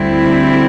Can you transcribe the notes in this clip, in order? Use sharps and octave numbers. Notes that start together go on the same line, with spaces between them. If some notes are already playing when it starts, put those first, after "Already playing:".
Already playing: D2 D3 G3 C4 E4